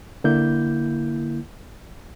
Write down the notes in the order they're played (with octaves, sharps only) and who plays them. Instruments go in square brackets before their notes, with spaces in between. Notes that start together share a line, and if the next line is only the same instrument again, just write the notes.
[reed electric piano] D3 A#3 E4 G6